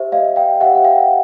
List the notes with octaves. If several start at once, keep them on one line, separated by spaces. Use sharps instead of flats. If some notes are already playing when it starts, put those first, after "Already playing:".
Already playing: G4 C5 E5
D#5 F5
F5 G5
G4 C5 E5 F#5
F#5
F5 G5